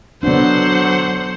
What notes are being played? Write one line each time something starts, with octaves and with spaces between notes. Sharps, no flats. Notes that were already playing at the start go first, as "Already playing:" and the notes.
D3 F#3 B3 D4 C5 F#5